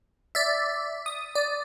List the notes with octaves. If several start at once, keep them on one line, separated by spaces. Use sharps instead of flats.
D5 E5
D#6
D5